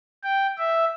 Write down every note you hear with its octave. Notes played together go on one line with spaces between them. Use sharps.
G5
E5